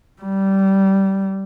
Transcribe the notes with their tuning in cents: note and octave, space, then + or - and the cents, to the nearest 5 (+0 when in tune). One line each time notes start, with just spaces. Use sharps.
G3 -15